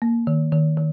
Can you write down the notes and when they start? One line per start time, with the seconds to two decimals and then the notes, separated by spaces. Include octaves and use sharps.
0.02 A#3
0.27 D#3
0.52 D#3
0.77 D#3